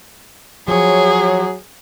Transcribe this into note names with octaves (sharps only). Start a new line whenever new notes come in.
F3 F#3 G#4 C#5